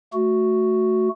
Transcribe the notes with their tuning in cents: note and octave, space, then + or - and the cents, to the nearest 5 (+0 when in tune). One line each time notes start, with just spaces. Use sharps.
A3 +0 F#4 +0